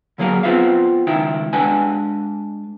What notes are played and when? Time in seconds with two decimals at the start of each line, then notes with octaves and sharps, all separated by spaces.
0.18 D3 F#3 A#3 G#4 A#4
0.43 B3 C4 F4 B4 C5 F5
1.07 C#2 D#3 E4 G5
1.53 G#3 D4 B4 G5 G#5